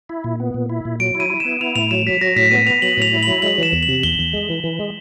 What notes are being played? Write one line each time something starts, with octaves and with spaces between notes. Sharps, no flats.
E4
A#2
B3
A#2
E4
A#2
F#3 D7
E4
D#7
E4
E7
B3
E4 F7
A2 F7
F#3 E7
F#3 B6
F#3 A#6
A2 B6
B3 D#7
B3 F7
F#3 F#7
A2 F7
E4
F#7
F#3
G#3 F#7
E3 E7
E2
F#7
C3
E2 G7
E2
G#3
E3
E3
G#3